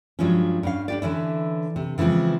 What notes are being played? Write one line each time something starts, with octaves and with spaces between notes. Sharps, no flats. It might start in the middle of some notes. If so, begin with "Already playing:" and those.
G2 F3 F#3 G#3 A#3 C#4
G2 C#4 F5
D4 G4 D5
D3 E3 C#4 E4
C3
C#3 E3 F3 G#3 C4